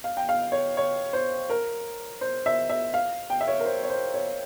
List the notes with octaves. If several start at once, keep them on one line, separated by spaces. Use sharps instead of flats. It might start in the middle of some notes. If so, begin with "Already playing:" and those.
F5
G5
F5
C#5
C#5
C5
A#4
C5
E5
E5
F5
G5
E5
C#5
A#4
C5
C#5
C5
C#5